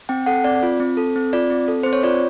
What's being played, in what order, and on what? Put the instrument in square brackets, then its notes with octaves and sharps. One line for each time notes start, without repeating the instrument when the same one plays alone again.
[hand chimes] C4 G5
A4 F#5
C4 D5
F4
C4
A4
C4
F4 D5
C4
A4
C4 C5
C#5
F4 D5